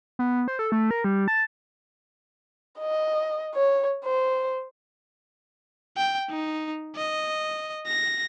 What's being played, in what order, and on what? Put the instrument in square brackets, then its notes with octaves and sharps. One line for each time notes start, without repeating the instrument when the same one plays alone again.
[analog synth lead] B3
C5
A4
A3
A#4
G3
A5
[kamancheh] D#5
C#5
C5
[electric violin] G5
D#4
D#5
A#6